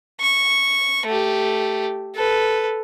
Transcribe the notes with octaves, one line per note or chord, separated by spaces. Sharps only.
C#6
A3 G4
A4 B4